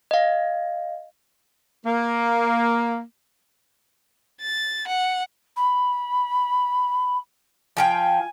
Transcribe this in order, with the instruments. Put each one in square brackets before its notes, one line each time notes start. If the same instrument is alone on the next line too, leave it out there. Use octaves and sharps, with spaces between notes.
[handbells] D#5 F5
[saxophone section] A#3
[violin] A6
F#5
[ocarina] B5
[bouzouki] F3 F4 G5 [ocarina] G#5